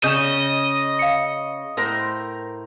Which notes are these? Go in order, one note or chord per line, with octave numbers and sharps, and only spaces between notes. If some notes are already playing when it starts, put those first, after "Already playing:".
C#3 C#4 D#5 G6 E7
F5 C#7
A2 A#4 C5